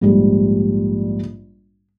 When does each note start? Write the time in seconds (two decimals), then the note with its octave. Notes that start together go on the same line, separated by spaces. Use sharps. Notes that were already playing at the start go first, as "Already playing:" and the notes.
0.01 A#1 G#2 G3